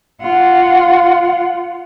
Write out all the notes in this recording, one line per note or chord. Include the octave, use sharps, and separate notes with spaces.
F4 F#5